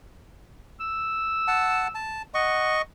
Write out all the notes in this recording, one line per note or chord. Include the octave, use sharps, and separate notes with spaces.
E6
F#5 A5
A5
D#5 F#5 C#6